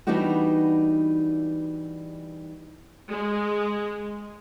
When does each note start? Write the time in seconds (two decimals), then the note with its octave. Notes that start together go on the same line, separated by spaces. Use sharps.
0.07 E3 G3 B3 D4 D#4 F#4
3.10 G#3